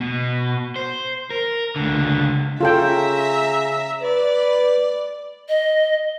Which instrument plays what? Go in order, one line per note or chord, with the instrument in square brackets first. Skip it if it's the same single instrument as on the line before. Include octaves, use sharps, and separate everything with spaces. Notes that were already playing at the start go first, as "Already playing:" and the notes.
[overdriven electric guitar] B2
C5
A#4
C#2 D3
[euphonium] C#3 [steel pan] F4 A4 G5 [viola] E5 A#5
[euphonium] B4 [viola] D5
[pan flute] D#5